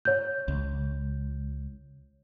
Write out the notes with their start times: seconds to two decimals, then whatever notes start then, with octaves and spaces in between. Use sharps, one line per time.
0.05 C#5 G6
0.48 C#2